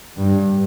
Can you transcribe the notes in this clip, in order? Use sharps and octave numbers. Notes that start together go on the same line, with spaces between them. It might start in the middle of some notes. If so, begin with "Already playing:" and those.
G2